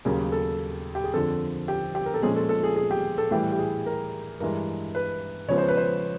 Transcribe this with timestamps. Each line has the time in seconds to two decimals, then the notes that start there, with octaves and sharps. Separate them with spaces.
0.05 D#2 C#3 F#3 A#3 G#4
0.32 A4
0.95 G4
1.04 G#4
1.14 F2 D3 F3 A4
1.68 G4
1.95 G4
2.06 A#4
2.14 A4
2.23 A#2 F3 G#3 C#4 G#4
2.36 A4
2.49 A4
2.63 G#4
2.76 G#4
2.91 G4
3.18 A4
3.31 A2 E3 G3 G4
3.52 G4
3.59 G#4
3.86 A#4
4.40 G2 E3 G#3 A#4
4.95 B4
5.48 C#3 F3 G#3 B3 C#5
5.58 C5
5.68 B4
5.77 C5